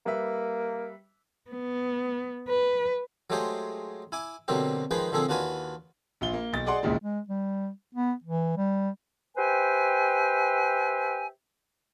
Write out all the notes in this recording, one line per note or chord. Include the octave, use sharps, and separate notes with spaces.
G3 A#3 B4 E5
B3
B4
F#3 G#3 A3 G4 G#4 C5
E4 G#5 D6
B2 D3 F#3 A#3 C4 G4
D#3 F3 G#3 G#4 B4 G5
A#2 D3 F3 C4 G#4 A4
D#2 D4 F4 F#4 B4 G#5
A#1 F4 G7
A#3
B1 A6
G#4 D5 D#5 F#5 C6
A#1 D#2 A#2 C#3 E3 G#3
G#3
G3
B3
E3
G3
G4 B4 C5 E5 G5 G#5